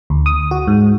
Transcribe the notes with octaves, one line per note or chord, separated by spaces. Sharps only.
D2
D#6
F#4
G#2